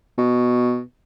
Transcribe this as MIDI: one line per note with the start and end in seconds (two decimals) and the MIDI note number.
0.18 0.80 47